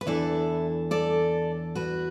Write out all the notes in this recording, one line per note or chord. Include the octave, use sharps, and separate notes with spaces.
B4
E2 E3 D4 E4 A4
A4 D5
F#4 B4